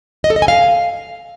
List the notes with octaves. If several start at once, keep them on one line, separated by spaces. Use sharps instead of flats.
D#5
A4
D#5
G#5
F5